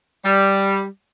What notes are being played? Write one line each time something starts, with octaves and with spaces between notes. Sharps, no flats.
G3